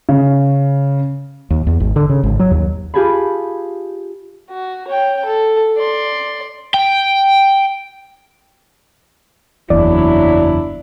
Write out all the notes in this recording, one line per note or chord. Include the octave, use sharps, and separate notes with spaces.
C#3
D#2
E2
G#1
D3
C#3
G#1
F#3
D#2
F4 G4 G#4 G#5 A5 B5
F#4
C#5 G5
A4
D5 C6
G5
F#1 E2 F#3 D4 E4 D5